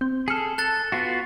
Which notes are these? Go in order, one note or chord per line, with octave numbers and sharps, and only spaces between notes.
C4
G#4 A4 F6 C#7
A4 F#6 A6
B3 F4 F#4